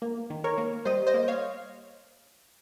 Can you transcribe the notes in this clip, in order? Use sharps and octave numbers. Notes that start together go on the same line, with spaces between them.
A#3
D#3
A#4 C#5
A#3
G3 C5 D#5
C5 D#5
A#3
C#5 F5